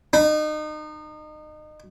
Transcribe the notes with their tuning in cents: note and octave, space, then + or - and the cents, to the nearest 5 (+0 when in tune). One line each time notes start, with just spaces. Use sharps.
D#4 -30